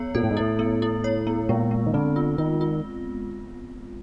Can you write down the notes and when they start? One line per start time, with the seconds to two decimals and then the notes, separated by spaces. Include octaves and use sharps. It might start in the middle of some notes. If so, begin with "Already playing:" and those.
Already playing: B3 C#5
0.15 A#2 A4
0.23 A2
0.31 G#2
0.37 A2 E4
0.59 B3
0.82 E4
1.04 C#5
1.27 B3
1.49 A#2 G#3
1.71 G#3
1.86 D#3
1.93 D3 C4
2.16 F4
2.38 D#3 F4
2.61 F4